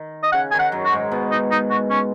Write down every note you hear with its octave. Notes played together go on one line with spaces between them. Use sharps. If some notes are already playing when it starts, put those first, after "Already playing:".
Already playing: D#3
D#5
C#3 F#5
D#3 G#5
F#5
F#2 F#3
F#4
G#2 G#3
B2 B3
D#4
D#4
F#4
C#4